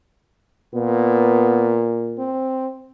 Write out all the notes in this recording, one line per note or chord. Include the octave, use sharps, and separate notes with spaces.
A#2 B3
C4